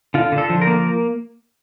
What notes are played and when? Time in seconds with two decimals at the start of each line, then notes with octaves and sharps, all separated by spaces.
0.14 D3 F4
0.32 D3
0.38 A4
0.50 F3
0.62 A#4
0.67 A#3